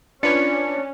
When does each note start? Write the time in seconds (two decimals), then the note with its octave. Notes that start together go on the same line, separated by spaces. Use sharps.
0.23 C#4 D4 F4 B4 C#5 D5 C#7